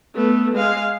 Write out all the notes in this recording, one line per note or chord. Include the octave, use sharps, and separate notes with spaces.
A3 B3
G#3 F5